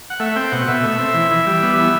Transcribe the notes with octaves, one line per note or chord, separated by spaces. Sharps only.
F#5
A3 E5
C4 G5
B2 F#5
B2 E5
A3
C4
E3
E3
G3
B3
E3